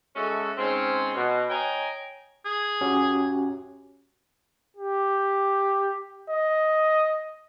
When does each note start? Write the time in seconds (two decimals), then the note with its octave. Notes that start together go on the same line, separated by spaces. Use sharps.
0.15 G#3 A3 C#4 F#4 A4 E5
0.57 G#2 C4 C#4
1.15 B2
1.50 C#5 D#5 G5 G#5 A#5
2.46 G#4
2.81 C#4 F#4 G4
4.77 G4
6.30 D#5